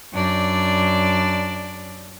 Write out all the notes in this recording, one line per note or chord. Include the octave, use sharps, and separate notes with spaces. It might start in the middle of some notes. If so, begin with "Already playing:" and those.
F#2 D4 D5